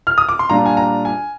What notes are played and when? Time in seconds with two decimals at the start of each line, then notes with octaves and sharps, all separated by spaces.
0.07 F6
0.18 D#6
0.29 D6
0.39 C6
0.50 A#2 G3 D4 F4 A#5
0.66 G#5
0.77 A#5
1.05 G#5